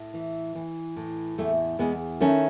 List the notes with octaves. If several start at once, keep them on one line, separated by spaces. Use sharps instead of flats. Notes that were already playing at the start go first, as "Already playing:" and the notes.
Already playing: A2
E3
E3
A2
E2 A3
E2 G#3 B3
D#3 A3 C#4